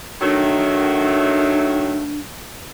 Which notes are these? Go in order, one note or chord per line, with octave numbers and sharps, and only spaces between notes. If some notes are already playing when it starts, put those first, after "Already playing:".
D#3 F#3 A3 D4